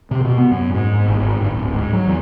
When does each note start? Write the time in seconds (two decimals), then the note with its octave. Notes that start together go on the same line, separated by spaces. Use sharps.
0.11 C3
0.24 B2
0.38 B3
0.51 F#2
0.74 G#2
1.08 G#1
1.20 G#1
1.41 G1
1.54 D1
1.74 G#2
1.93 F#3
2.07 E2